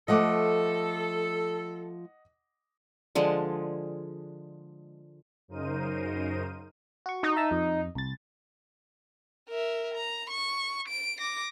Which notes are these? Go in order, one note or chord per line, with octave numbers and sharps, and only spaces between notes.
F3 A3 A4 D#5 F#5 D6
D3 F3 G#3
F#2 C#3 D#4 A#4 C5 D#7
F#4 C#6
D#4
E5 A5 E6
F2
C2 A6
A#4 E5
A#5
C#6
D7
D6 A#6